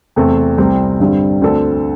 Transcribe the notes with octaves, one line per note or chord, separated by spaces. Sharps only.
E2 C3 A3 C4 A4
C2 C3 G3 C4
G2 D3 G3 C4
D2 D3 C4 A4